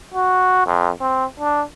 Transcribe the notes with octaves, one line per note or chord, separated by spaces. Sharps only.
F#4
F2
C4
D4